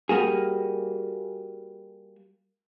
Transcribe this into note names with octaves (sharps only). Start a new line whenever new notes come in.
G3 A#3 F#4 G#4